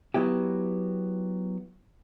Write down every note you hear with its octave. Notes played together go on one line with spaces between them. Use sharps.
F#3 B3 E4 G4